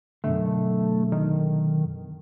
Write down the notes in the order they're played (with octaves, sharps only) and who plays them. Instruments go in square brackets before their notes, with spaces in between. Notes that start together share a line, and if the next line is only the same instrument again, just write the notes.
[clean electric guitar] F#2 B2 D3 [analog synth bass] A3
[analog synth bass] D#3